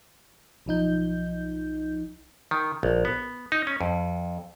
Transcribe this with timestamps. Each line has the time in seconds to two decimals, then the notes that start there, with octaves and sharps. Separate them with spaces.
0.66 B1 F3 D#4 G6
2.51 D#3
2.83 A#1
3.05 B3
3.52 D#4
3.67 C#4
3.81 F2